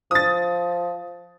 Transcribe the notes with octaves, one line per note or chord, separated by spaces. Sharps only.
F3 D#6 A6